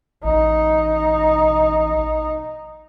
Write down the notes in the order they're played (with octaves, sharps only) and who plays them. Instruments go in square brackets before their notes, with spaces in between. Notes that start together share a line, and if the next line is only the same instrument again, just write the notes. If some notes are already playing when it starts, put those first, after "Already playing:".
[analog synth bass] A1 [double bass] D#4